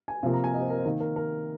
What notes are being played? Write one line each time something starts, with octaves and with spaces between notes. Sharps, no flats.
G#5
C3 F3 A#3 F5
A#5
G#5
D#5
C5
A#4
C5
D#3 A#3 A#4
A#4
A#4